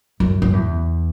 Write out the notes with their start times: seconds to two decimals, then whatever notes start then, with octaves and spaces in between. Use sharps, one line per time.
0.20 F#2
0.42 F#2
0.53 E2